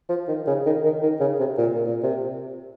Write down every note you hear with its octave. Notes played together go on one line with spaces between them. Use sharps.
F3
D#3
C#3
D#3
D#3
D#3
C#3
C3
A#2
A#2
C3